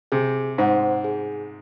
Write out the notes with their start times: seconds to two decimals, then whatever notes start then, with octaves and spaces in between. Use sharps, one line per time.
0.12 C3 G#4
0.58 G#2 C5 F#5
1.04 G#4